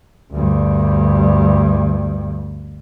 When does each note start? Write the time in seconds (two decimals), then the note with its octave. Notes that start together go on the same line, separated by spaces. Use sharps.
0.33 D2 G2